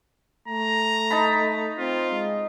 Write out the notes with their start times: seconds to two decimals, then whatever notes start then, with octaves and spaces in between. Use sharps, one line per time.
0.48 A3 A#5
1.10 D#4 A5 B5
1.79 C4 F4
2.12 G#3